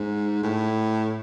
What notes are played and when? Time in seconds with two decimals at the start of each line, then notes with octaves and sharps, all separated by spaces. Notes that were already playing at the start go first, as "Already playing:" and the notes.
Already playing: G#2
0.43 A2